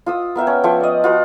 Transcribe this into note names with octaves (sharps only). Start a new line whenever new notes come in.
F4 D#6 E6
B3 A#4 E5 G5
C#4
F3 E5 G5 C#6
D5 D#5
F4 F#4 B4